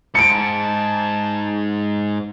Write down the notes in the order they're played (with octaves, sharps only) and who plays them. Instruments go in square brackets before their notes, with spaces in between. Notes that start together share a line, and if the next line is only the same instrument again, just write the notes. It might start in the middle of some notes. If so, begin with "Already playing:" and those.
[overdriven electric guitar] G#2 [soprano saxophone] A5 [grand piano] C#7 D7